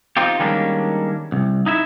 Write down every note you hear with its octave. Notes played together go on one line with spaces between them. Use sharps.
C4 D#4 F4 G4
D#3 G3 G#3 A#3 C#4 D4
C2
D#4 E4 E5